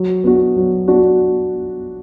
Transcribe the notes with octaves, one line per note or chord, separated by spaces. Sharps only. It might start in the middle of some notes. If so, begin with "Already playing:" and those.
Already playing: F#3
B3 D4 F#4
F#3
B3 D4 F#4